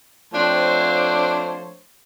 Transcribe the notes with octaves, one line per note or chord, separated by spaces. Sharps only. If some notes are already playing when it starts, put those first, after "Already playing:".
F3 A3 C4 D4 C5 C#5